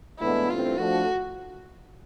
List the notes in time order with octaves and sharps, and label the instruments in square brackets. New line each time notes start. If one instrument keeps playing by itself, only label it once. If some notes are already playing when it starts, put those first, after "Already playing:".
[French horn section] A2 E3 G#3 B3 D4 [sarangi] E4
[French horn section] G2 E3 A3 C4 [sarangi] F4
[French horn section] F3 A3 D4 [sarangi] F#4